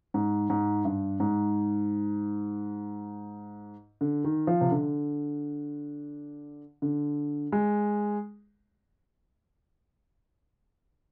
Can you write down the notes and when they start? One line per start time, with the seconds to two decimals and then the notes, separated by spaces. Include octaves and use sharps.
0.14 G#2
0.50 G#2
0.85 G2
1.20 G#2
4.01 D3
4.24 D#3
4.47 F3
4.61 C3
4.71 D3
6.82 D3
7.52 G#3